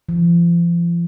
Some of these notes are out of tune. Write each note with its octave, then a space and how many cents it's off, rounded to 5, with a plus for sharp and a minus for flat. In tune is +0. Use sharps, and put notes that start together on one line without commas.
F3 -35